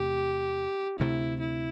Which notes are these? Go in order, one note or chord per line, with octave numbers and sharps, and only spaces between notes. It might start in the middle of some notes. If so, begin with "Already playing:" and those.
Already playing: E2 C3 A3 G4
D2 C3 A3 E4
E4